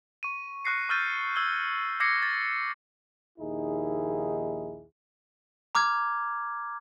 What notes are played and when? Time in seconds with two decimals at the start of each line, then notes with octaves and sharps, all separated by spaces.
0.23 C#6 D#7
0.65 C#6 F6 F#6 A#6 C7 C#7
0.89 C#6 E6 F6 G6 A6 D#7
1.36 E6 G#6 G7
2.00 D6 E6 G#6 A#6 C7 C#7
2.23 A6
3.39 A#1 D#2 D#4 E4 G#4
5.75 A#5 D6 F6 G#6